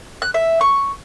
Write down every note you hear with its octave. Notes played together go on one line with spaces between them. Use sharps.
F#6
E5
C#6